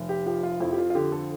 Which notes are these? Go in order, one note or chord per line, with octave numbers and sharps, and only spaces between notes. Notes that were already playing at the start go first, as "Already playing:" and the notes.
Already playing: F1
G4
F3 G4
F4
F2 E4
G4
F4
F4
D3 G4
A4